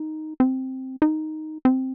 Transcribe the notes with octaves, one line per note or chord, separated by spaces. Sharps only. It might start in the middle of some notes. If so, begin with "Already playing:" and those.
Already playing: D#4
C4
D#4
C4